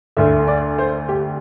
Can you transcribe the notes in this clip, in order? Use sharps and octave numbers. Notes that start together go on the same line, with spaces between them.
D2 D3 E5
D5
C5
G4